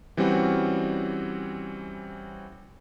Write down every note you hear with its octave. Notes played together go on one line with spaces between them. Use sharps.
E3 G3 C4 C#4 F#4